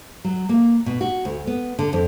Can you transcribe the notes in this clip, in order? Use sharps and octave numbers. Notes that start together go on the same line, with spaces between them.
F#3
A#3
B2
F#4
D2
B3
D3
F2